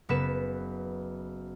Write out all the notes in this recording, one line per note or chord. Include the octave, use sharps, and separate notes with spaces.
F#1 B3 B4 E7